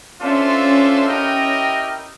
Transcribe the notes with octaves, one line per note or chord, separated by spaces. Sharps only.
C#4 D4 F4 A4 C5 E5
C#4
C#4 E4 G4 A#4 D#5 G5